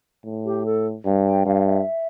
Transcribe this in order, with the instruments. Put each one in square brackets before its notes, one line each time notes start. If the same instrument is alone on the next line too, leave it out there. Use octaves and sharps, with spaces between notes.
[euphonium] A2
[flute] G4
A4
[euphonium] G2
[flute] G5
[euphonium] G2 [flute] F5
[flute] E5